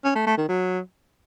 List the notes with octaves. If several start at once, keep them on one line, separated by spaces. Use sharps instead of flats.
C#4
A3
A3
D#3
F#3